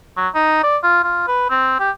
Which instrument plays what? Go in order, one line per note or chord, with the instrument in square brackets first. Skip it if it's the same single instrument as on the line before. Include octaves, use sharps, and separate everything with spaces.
[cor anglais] F#3
D#4
D5
F4
F4
B4
C4
G4